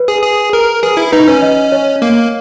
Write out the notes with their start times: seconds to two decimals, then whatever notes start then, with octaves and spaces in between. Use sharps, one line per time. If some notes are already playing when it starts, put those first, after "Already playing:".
Already playing: B4
0.08 G#4
0.22 G#4
0.53 A#4
0.83 G#4 B4
0.97 E4 B4
1.12 D#4 B4
1.27 C#4 B4
1.42 D#5
1.72 C#5
2.02 A#3